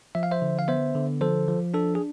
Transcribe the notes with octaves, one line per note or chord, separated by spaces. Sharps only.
F3 E5
F5
C5 E5
D3
F5
B3 C5 E5
D3
F3 A4 C5
F3
D4 A4
G#4